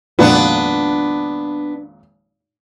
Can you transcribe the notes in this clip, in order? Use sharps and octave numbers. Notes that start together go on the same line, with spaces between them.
G#1 F2 A#2 B3 D4